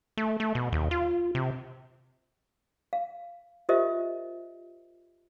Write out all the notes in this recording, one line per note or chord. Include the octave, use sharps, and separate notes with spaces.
A3
A3
B2
D#2
F4
C3
F5
F4 G4 A#4 C5 D#5 E5